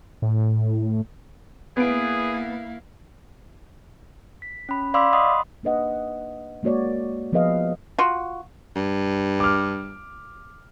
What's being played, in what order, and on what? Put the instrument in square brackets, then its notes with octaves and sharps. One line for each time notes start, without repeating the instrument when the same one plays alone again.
[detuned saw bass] A2
[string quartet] A#3 E4 F5 [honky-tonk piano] B3 D7 [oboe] G#4
[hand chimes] B6
C#4 B5
D5 F5 B5 C6 D6 E6
D#5 F#5 B5 C6 D#6
[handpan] A#3 D4 B4 D#5 F#5
G#3 A#3 F#4 C#5 D5
F3 B3 G#4 B4 D#5 F5
[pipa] F4 F#4
[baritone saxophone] G2
[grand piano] D6 F6